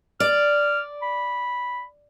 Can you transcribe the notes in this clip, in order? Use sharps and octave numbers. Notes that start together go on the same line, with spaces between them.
D5 F6
B5